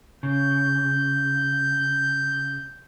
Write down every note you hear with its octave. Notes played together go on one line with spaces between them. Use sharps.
C#3 G6